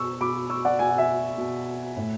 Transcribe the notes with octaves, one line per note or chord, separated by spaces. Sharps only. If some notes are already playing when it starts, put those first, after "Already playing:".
Already playing: B2 C#6 E6
B2 B5 D6
C#6 E6
D5 F#5
B2 G#5
F#5
E5 G#5
B2
A2